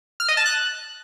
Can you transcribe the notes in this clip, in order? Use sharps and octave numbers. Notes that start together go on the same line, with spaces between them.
F6
D#5
A5
F#6